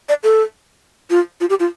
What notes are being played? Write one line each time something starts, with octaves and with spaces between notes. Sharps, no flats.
D5
A4
F4
F4
G4
F4